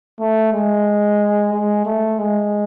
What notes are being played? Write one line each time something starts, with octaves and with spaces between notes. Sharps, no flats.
A3
G#3
G#3
A3
G#3